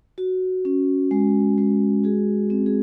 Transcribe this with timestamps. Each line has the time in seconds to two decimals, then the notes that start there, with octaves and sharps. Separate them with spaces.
0.18 F#4
0.65 C#4
1.11 G#3
1.58 G#3
2.04 F#4 G#4
2.50 C4
2.66 G#4